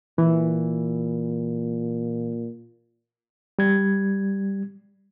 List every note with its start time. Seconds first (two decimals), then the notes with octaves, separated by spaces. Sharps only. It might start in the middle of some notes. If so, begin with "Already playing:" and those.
0.18 A#2 E3
3.59 G3 G#6